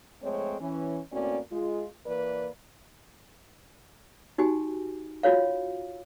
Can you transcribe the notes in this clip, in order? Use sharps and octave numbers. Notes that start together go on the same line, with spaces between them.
F2 G#3 A3 C4 C#5
E3 C#4
A2 A#3 C4 C#4 F#4 D5
G#3 F4
E3 A#3 B4 D5
D#4 F#4 G4 G#5
F4 F#4 C#5 F5